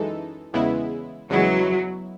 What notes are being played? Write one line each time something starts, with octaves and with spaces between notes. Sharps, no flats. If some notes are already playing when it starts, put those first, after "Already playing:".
Already playing: F#2 E3 G#3 D#4 A4
E2 C#3 G#3 B3 E4
E2 C#3 F#3 G#3 B3 E4